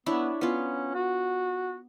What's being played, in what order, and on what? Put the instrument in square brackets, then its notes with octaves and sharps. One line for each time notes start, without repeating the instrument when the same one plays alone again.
[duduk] B3 [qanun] D4 E4 C#5
[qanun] B3 F4 [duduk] C#4
[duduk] F#4